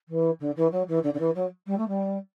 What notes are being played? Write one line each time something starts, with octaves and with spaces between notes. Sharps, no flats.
E3
D3
E3
F#3
E3
D3
D3
E3
F#3
G3
A3
G3